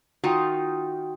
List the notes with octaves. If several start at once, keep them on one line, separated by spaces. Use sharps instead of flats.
D#3 D#4 F4 F#4 G5